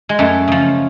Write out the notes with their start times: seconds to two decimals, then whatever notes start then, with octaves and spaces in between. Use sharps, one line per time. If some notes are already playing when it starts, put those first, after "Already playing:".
0.09 G#3
0.19 F#2 A3
0.48 C#3 F3